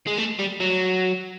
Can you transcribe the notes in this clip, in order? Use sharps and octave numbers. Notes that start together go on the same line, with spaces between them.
G#3
A3
G3
F#3